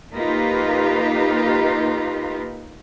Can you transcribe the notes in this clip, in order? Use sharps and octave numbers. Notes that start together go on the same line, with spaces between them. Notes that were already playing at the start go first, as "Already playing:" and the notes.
A#3 D#4 F4 G4 B4